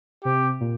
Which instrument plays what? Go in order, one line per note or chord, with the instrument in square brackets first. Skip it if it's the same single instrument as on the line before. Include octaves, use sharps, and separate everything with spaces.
[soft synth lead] C3 [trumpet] G4
[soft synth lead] A#2